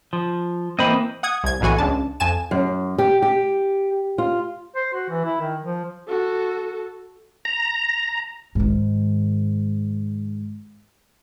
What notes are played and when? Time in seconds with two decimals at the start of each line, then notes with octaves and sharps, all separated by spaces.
0.13 F3
0.79 E3 A#3 C4 C5 D#5 B5
1.23 F#5 D#6 G#6
1.44 C2 G#6
1.61 B1 A2 E3 F#4 G#5
1.78 C#2 D4 A5
2.20 F2 G#5 A5 E7
2.51 F#2
2.98 G4
3.22 G4
4.18 F4
4.76 C5
4.94 F#4
5.10 E3
5.25 E4
5.41 D#3
5.63 F3
6.08 F#4 A4
7.45 A#5
8.55 G#2 D#3